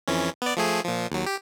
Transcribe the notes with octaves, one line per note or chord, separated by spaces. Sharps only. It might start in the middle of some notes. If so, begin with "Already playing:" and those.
F2 E3 C#4
B3 D5
F3 A3 G#4
A#2 F3
D#2 F#3
G4